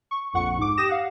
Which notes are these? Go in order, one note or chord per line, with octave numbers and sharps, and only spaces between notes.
C#6
A#1 F2 F#5 C#6 C#7
G#2 D6
G4 D#6 A#6 E7
F5 F#5